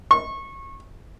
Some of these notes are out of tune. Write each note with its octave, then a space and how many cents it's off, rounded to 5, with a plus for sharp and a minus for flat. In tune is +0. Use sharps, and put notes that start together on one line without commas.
C#6 -25